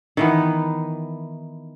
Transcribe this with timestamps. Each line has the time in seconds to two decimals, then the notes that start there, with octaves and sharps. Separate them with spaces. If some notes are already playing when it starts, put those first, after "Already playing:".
0.17 D#3 E3 B3